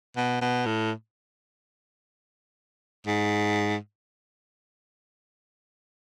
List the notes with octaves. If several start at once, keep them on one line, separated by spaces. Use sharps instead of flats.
B2
B2
A2
G#2